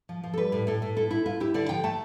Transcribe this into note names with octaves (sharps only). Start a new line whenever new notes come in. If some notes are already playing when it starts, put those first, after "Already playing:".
F3
F3
A4
G3 B4
A2
A2 A4
A2
E4 A4
E4
E4 F4
E4 G4
D3 D5
F3 G5
A3 A5